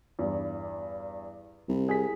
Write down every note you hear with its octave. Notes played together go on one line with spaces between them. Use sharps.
E2 G2
C2
G#4 B6